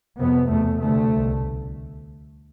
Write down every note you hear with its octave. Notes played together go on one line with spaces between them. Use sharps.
F2 C3 B3
E2 B2 A3
D2 C3 A3
C2 B2